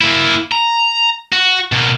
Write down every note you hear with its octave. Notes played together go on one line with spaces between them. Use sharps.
A#3 E4
A#5
F#4
B2 A#3